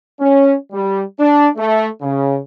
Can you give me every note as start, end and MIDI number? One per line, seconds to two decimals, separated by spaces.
0.19 0.54 61
0.72 1.02 55
1.19 1.48 62
1.56 1.86 57
2.02 2.38 49